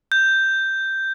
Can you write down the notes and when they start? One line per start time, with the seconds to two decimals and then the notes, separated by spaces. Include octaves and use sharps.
0.12 G6